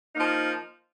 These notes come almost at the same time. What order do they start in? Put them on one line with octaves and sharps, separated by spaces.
D#4 A#3 F3